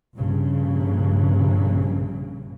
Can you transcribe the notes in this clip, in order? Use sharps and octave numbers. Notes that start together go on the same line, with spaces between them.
A#1 G2 C#3